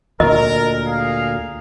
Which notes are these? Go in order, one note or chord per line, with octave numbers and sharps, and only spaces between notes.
D2 A#2 A#4 D#5
G#4 A#4 F5